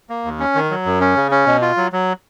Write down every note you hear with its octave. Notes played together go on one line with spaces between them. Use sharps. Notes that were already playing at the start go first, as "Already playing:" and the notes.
A#3
D#2
C#4
D#3
F#3
F#2
C#4
C#3
C#4
B2
F4
F#3
F#3